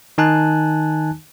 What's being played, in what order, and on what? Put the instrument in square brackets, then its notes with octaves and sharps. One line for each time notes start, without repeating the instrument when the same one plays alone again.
[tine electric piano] D#3 D#4 G#5 A5 F#6